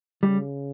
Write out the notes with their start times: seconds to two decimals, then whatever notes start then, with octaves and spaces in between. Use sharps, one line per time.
0.23 C#3 G3